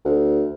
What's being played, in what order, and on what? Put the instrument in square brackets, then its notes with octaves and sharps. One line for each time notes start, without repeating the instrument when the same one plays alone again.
[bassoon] D2